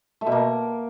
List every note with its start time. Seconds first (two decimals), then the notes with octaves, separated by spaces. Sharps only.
0.21 A3
0.26 B2
0.32 A#3